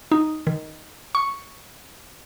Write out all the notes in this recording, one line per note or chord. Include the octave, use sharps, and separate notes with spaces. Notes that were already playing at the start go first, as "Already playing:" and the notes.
D#4
D#3
C#6